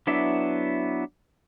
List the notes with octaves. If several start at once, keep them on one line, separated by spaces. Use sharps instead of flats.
F#3 B3 D4 E4 E5